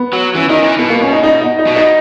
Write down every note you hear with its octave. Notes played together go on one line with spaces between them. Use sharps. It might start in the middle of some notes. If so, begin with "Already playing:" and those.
Already playing: B3
F#3
E3 C#4
D#3 D#4
E3
B2 B3
A#3
C#4
D#4
D#4
D#4
D#4
B2
D#4